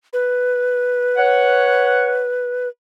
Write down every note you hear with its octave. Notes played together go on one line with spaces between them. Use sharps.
B4
C#5 F#5